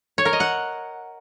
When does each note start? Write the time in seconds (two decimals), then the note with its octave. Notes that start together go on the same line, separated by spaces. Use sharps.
0.18 C#5
0.25 A#4
0.33 D#5
0.40 F#5